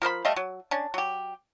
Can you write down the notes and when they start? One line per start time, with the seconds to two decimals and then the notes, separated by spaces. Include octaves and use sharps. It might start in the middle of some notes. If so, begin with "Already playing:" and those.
0.02 F3 A#4 C5 B5
0.25 G3 A3 D#5 F5
0.36 F#3
0.71 C#4 D4
0.94 F#3 G4